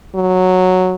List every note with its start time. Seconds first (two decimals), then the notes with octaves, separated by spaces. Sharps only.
0.15 F#3